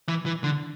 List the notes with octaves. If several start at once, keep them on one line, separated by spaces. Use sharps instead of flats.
E3
E3
D3